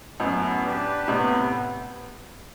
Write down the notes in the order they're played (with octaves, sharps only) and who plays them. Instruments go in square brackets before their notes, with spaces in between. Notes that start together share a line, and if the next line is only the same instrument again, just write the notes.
[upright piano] F#2 A2 [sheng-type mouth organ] B3
[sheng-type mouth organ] D4 G4 B4
[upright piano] A2 C3 [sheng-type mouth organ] B3